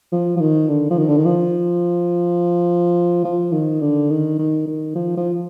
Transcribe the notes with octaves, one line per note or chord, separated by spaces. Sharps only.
F3
F3
D#3
D3
F3
D#3
D3
D#3
F3
F3
D#3
D3
D#3
D#3
D#3
F3
F3